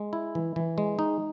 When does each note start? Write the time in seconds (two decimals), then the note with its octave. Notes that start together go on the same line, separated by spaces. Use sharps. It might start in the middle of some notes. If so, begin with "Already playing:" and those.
Already playing: G#3
0.13 E4
0.35 E3
0.56 E3
0.78 G#3
0.99 D#4